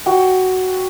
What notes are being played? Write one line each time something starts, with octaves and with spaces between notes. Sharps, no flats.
F#4 G5